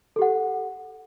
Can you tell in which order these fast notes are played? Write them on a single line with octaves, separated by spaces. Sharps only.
A4 G4 F#5